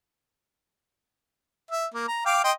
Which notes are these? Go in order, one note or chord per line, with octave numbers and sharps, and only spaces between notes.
E5
A#3
A#5
F5 G5 D6
D#5 G5 C6